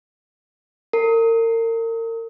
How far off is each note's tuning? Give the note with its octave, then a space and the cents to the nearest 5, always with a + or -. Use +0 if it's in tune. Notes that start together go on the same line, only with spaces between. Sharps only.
A#4 -35